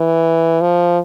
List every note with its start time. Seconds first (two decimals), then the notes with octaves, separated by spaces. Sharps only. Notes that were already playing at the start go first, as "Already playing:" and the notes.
Already playing: E3
0.61 F3